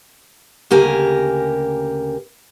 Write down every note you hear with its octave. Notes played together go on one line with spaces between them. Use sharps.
D2 C#3 A#3 G4 A#4 G#5